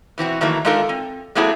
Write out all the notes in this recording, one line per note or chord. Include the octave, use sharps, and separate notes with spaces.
B2 E3 C4 F#4
D#3 E3 F#3 A3 A#3
G#3 D4 D#4 F4 A4 A#4
C4
F#3 A3 A#3 C4 E4 G#4